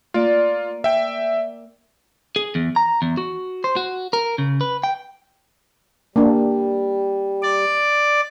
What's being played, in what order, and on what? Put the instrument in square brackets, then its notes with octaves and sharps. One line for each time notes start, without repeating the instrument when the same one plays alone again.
[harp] A#3 D5 [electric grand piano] F4
[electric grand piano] E5 G5
[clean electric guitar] G#4
E2
A#5
E2
F#4
C5
F#4
A#4
C#3
B4
G5
[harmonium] G3 [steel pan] A#3 D4
[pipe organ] D5